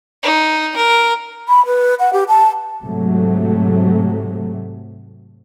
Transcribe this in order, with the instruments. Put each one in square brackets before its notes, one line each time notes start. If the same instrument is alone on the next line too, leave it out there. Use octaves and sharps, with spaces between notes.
[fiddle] D#4
A#4
[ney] B5
B4
F#5
G4
A5
[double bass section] G#2 C3 F#3 A3